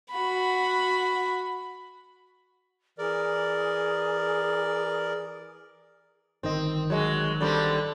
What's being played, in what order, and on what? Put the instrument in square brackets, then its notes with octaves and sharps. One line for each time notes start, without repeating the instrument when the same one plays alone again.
[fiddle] F#4 B5
[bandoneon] E3 A#4 D5 [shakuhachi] G#4
[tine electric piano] G1 D#3 D#5 [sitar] C4
[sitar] F#3 G#3
D3 G3 C4